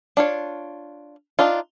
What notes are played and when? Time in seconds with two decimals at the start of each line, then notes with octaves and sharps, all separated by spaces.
0.17 D4 F4 C#5
1.39 D4 D#4 F4